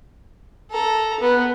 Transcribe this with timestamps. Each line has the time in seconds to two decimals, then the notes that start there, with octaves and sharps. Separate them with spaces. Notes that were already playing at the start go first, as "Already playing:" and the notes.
0.71 A4 A#5
1.20 B3